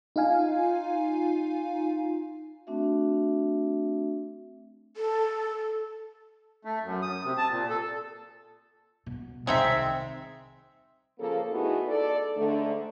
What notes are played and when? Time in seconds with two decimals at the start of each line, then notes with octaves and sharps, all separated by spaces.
0.16 D#4 F4 F5 G#5
2.67 A3 C4 D4 F#4 E5
4.97 A4
6.65 A3
6.83 F#2
7.02 D#6
7.24 C3
7.38 A5
7.51 A#2
7.69 A4
9.06 B2
9.47 C2 D#3 G#3 C4 D#4 E5
11.19 A#2 C#3 F3 A#3 A4
11.52 A3 B3 D#4 E4 F#4 G#4
11.87 A4 D5
12.37 G#2 D3 A3